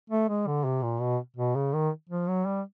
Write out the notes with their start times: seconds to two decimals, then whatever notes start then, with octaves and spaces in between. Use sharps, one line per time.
0.10 A3
0.29 G#3
0.47 D3
0.64 C3
0.83 A#2
1.01 B2
1.37 B2
1.55 C#3
1.73 D#3
2.09 F3
2.27 F#3
2.46 G3